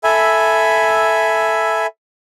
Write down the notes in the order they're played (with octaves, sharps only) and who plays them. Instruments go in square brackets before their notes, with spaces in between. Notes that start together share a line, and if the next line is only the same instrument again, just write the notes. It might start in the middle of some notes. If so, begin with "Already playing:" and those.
[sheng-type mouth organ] A4 E5 G#5 B5